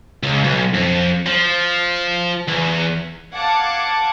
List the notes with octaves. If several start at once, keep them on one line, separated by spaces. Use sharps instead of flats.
C#2
B1
F2
F3
E2
F5 F#5 A5 D6 G#6